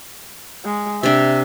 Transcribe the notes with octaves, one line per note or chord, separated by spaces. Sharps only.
G#3
C3 D4 E5